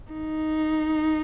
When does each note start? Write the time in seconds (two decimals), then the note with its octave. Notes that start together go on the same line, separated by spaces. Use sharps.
0.13 D#4